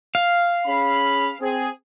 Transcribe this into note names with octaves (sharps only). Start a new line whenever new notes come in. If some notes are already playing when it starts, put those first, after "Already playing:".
F5
C#4 G#4 B5
C4 G#4